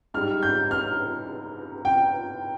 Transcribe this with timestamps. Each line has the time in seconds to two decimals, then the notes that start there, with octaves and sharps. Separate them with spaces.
0.14 G#2 G3 F6
0.43 G6
0.71 F6
1.85 G5